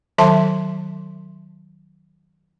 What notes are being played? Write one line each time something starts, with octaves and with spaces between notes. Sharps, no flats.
D#3 F#3 E5 A5 C6